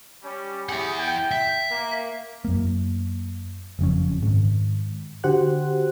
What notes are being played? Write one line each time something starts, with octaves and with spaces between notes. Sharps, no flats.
G3 C#4
E4 G4 G#4 F#5
G5
E5
A#3
F#2 A#3
F#1 F2 C#4
G#2 D#3
D3 F#4 G4 C5 F#5 F#6